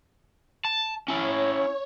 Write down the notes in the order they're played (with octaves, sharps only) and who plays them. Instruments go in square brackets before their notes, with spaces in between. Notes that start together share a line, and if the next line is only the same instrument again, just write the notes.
[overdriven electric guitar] A5
[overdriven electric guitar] C#4 E4 [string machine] C#5